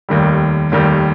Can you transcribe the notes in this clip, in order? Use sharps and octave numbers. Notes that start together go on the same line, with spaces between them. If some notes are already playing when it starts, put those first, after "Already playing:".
F1 D#2 D#3 G3
F1 D#2 D#3 G3